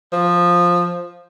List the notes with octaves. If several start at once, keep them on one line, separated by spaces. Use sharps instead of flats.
F3